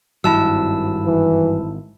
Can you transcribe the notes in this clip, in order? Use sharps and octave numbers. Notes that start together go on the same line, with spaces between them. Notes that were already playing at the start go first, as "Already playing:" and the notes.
G#1 G2 F#3 E4 A5 E6
E3